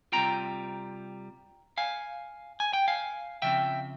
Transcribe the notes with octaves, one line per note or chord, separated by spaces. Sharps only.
C3 G3 C4 F4 G5 A#5
F5 G#5
G#5
G5
F5 G#5
C#3 F3 C4 E5 G5